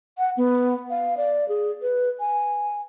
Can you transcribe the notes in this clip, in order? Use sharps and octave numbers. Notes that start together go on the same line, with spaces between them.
F#5
B3
F5
D5
G#4
B4
G#5